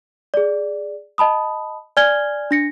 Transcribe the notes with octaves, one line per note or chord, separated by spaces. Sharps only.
G#4 D5
D#5 A5 B5 D#6
D5 G#5 F6 G#6 G7
D4 A#6 C#7